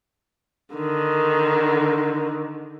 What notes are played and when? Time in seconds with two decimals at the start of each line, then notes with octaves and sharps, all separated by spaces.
0.75 D3 D#3